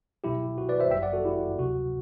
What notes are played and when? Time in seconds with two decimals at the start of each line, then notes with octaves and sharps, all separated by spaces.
0.24 C2 B2 F#3 E4 G4
0.58 F#4
0.69 B4 D5
0.80 C5 E5
0.91 G1 F#2 F#3 E5 G5
1.03 D5 F#5
1.13 F#4 A4
1.24 E4 G4
1.59 D2 C3 F#3 F#4